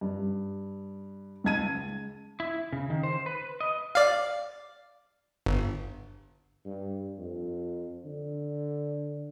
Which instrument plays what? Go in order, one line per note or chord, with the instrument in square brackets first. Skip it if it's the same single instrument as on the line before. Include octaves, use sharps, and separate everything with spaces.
[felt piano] G2
C#2 A5 G#6 D#7
[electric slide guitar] E4
C#3
D#3
C5
B4
D#5
[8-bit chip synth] D5 F5
G1
[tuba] G2
F2
D3